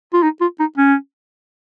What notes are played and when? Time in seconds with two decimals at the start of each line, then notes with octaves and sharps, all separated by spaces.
0.13 F4
0.23 D#4
0.41 F4
0.60 D#4
0.78 C#4